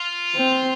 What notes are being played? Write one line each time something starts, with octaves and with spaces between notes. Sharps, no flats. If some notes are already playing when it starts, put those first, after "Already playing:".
Already playing: F4
C4